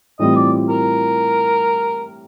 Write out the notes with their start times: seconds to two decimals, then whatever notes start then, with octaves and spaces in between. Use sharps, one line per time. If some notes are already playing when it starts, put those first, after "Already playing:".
0.19 A2 E3 G3 C4 F4 D#5
0.36 D5
0.69 A#4